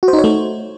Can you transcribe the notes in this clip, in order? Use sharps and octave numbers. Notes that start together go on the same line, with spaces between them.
F#4
C5
D#4
C#5
A3